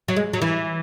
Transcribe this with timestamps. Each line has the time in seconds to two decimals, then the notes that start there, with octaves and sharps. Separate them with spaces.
0.08 F#3
0.16 G#3
0.33 F#3
0.42 E3